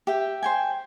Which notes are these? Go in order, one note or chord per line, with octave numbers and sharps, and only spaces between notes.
G4 E5 G5
C5 G5 G#5